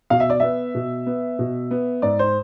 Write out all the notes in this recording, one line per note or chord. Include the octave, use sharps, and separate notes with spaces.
B2 F5
E5
D5
B3 E5
B2
B3
B2
B3
G#2 D5
C5